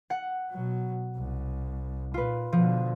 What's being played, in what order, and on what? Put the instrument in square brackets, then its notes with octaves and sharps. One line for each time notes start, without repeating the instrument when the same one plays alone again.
[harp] F#5
[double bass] B2 F#3
C2
[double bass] A#2 [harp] F4 B4
[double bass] B2 D3 [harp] F3